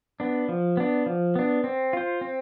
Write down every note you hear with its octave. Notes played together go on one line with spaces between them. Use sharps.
B3 D4
F3
B3 D4
F3
B3 D4
C4
F4 C5
C4